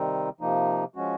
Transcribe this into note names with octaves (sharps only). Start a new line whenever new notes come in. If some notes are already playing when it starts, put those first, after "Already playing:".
Already playing: C3 D#3 G3 C4 D#4
C3 F3 A#3 D#4
F3 G#3 C#4 F#4